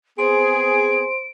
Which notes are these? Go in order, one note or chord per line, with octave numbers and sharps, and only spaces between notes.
B3 C4 G#4 C5 C6 D7